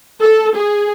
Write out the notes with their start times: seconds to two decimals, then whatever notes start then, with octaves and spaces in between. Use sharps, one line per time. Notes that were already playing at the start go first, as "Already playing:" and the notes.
0.21 A4
0.56 G#4